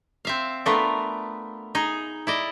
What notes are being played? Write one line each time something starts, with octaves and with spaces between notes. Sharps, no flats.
C4 E5 F5
A3 B3 D4 F4 A#4
D#4 G#4
E4 D5 D#5